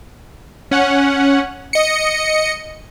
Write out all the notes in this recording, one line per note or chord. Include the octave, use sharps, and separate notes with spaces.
C#4 F#5
D#5 C#7